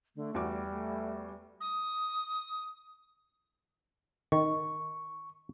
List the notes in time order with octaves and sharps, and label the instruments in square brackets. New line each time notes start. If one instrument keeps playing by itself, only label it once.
[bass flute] D3 [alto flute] A3
[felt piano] E2 F#4 D6 [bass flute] G3
[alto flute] A3
[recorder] D#6
[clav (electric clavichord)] D#3 [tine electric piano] C#6